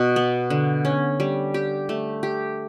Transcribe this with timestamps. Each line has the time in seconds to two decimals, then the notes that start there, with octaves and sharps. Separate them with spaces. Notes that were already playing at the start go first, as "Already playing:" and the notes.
Already playing: B2
0.16 B3
0.50 D3
0.85 C#4
1.20 G3
1.54 G4
1.89 A3
2.23 G4